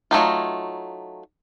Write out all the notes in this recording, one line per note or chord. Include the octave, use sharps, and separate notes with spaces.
F#3 A3 D#4 F4